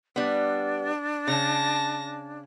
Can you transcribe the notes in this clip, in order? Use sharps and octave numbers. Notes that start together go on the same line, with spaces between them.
G3 B3 D4
C#3 A5 A#6